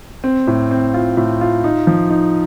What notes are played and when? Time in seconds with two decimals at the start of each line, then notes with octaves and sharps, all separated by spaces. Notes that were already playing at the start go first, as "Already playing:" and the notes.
0.24 C4
0.47 A2
0.71 C4
0.94 F4
1.17 A2
1.41 F4
1.64 D#4
1.87 F3
2.10 D#4